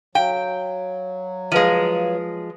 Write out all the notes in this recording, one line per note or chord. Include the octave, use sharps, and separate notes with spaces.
F#3 F5 G5
F3 G#3 B4 F5 D#7